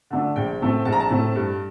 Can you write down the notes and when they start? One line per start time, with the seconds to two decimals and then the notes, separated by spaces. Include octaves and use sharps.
0.11 D3 A3 D4
0.36 A#1 G5
0.61 A2 A3 C4
0.85 A#1 A5
0.92 A#5
1.00 A5
1.10 A2 A3 C4
1.35 G2